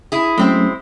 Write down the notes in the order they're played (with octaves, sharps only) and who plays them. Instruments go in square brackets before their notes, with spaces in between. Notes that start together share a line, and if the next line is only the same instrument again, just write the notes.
[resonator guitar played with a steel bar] E4 G#4
[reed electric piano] F#3 A3 C#4 [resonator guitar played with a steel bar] G#3 C4 E4